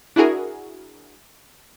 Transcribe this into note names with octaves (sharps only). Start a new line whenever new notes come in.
D4 E4 F#4 G#4 A#4